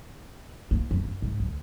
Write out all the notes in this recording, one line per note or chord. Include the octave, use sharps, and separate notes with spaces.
A#3
F2
F#2
G#2
D2